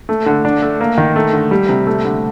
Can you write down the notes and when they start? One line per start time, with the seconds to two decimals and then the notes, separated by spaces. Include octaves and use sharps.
0.09 A3
0.26 D3
0.45 D4
0.62 A3
0.81 A#3
0.98 D#3
1.16 A3
1.33 D3
1.51 G3
1.69 C3
1.87 A3
2.05 D3